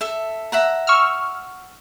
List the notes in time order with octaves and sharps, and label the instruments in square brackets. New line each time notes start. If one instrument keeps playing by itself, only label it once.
[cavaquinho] A4 E5
E5 F#5 A#5
[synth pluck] C#6 E6 F6